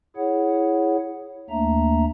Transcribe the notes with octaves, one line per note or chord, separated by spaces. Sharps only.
E4 G#4 C#5 F#5
D#2 A3 A#3 D4 E5 A#5